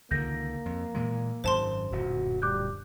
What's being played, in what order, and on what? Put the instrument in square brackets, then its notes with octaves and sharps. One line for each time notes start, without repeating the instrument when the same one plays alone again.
[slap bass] C#2 D3 D#3 [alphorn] A#3 [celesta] G6 A#6
[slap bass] F2
A#2 E3 G#3
[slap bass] G#1 F#2 [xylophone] C5 A5 C6
[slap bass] D1 F#2 A#2 [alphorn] F#4
[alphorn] G3 [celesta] D6 F#6 G6